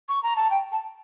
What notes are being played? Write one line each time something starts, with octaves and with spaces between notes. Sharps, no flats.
C#6
A#5
A5
G5
A5